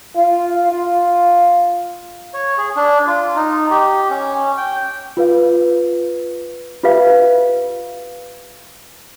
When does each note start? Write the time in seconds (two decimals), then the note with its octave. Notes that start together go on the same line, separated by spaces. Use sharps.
0.16 F4
0.72 F4
2.34 C#5
2.58 G#4
2.76 D4
3.07 F4
3.36 D#4
3.71 G4
4.10 C#4
4.57 G5
5.17 F4 B4 F5
6.83 F4 G4 B4 E5 F5